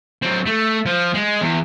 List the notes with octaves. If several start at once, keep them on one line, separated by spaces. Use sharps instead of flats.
F#3 C4
A3
F3
G#3
E2